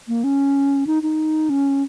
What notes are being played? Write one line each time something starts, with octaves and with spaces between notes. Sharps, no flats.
A#3
C#4
D#4
D#4
C#4